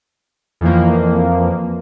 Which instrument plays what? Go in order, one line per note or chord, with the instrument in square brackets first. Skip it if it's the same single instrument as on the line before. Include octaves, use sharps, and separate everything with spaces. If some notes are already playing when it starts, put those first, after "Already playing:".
[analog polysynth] F2 E3 F3 A#3